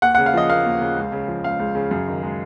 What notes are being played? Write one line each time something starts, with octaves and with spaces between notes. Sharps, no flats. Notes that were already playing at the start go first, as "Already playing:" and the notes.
D#2 F#5
C#3 F#5
F5
F3 D#5
A#3 F5
D#2
C#3
C#2
C#3
F3
C#2 F5
C#2
C#3
F#2
D#3
G#3